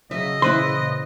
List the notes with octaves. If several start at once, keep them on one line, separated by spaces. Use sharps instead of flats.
C#3 F#3 D#5 E5
A#2 C#3 E3 E4 B4 C5 C6